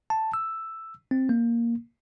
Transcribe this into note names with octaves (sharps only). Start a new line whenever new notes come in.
A5
E6
C4
A#3